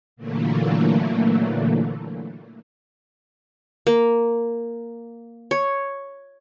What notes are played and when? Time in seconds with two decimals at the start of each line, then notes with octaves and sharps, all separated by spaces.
0.16 A#2 D3 E3 F#3 A3 A#3
3.87 A#3
5.51 C#5